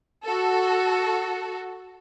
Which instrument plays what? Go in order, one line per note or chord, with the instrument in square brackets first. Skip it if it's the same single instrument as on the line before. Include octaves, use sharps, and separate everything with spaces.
[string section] F#4 A4